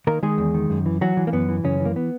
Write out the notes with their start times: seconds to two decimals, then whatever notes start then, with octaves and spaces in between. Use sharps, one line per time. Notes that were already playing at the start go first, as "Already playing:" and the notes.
0.07 D#3 A#3 A#4
0.23 D#3 G#3 G#4
0.38 E2
0.54 D#3
0.70 F#2
0.86 E3
1.01 E3 F#3 F#4
1.17 E3
1.27 A#3
1.33 F#2 B3
1.49 E3
1.64 F#2 C#3 C#4
1.80 E3
1.85 A#3
1.96 B3